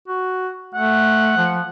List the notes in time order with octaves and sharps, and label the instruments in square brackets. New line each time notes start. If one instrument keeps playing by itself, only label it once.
[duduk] F#4
[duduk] A3 [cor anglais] F#5
[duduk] F3